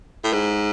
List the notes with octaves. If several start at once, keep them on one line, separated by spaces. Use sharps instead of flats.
A2
G#2